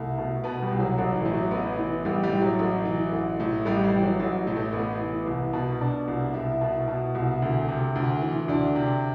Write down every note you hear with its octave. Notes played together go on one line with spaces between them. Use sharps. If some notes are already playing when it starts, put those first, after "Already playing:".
Already playing: C2 A3
B2
B2 B3
G3
C2
F#3
A1 F#3
E3
A2
F#3
A1 B3
E3
A1 G3
G3
A2
F#3
A1
E3
A1
A2
A1 G3
G3
E3
F#3
A1 F#3
A2
A3
A1 B3
E3
C2
B2
B2 D4
C2
C2 E4
B2
B2
C2
D2
C3
D2
E3
D2 D4
C3